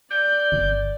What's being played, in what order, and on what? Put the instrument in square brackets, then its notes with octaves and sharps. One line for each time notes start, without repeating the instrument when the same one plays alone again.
[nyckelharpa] D5 [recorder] G6
[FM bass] G1